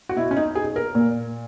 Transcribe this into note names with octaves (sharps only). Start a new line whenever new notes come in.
F#4
B2 E4
C#4
D#4
G#4
A#4
A#2